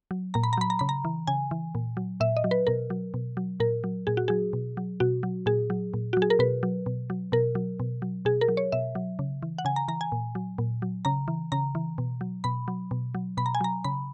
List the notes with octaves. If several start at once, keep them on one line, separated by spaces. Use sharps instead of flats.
F#3
A#2 A#5
B5
A#5
F#3 B5
A#5
C#3 B5
A#5
E3
C#3 G#5
E3
A#2
F#3
A#2 E5
D#5
F#3
B4
B2 A#4
F#3
B2
F#3
A#2 A#4
F#3
A#2 G#4
F#4
F#3 G#4
B2
F#3
B2 F#4
F#3
A#2 G#4
F#3
A#2
F#3 F#4
G#4
A#4
B2 B4
F#3
B2
F#3
B2 A#4
F#3
B2
F#3
B2 G#4
A#4
F#3
C#5
B2 E5
F#3
C#3
E3
F#5
C#3 G#5
A#5
E3 A#5
G#5
A#2
F#3
A#2
F#3
C#3 A#5
E3
C#3 A#5
E3
B2
F#3
B2 B5
F#3
B2
F#3
B2 B5
A#5
G#5
F#3 A#5
C#3 B5